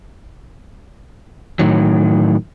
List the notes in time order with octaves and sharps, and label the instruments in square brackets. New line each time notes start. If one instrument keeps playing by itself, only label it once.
[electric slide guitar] A2 D#3 F#3